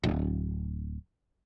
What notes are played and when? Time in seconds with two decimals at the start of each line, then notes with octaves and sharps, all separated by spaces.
0.04 D1